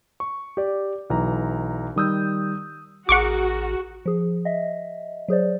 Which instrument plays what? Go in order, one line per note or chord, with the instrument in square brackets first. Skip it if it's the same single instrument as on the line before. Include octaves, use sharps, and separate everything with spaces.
[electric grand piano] C#6
G4 D5
B1 E3 A#5
D#3 G3 D#6 E6 G6
[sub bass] A1 [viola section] F#4 [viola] G#4 A#4 [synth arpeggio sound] F#5 C#6 D6
[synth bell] F3 G#4
D#5 E5
F#3 G#4 C5 D5